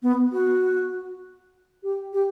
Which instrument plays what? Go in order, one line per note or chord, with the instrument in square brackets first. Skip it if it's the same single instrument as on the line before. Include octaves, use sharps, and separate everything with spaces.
[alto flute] B3
F#4
G4
G4